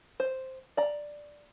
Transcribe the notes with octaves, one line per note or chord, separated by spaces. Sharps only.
C5
D5 A#5